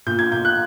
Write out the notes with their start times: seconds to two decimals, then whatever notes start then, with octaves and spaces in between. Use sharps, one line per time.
0.06 A#2 G6
0.19 G#6
0.32 A#2 G6
0.45 F#6